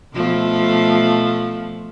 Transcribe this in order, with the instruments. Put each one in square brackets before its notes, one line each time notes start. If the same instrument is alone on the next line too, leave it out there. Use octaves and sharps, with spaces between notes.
[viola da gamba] B2 F3 A3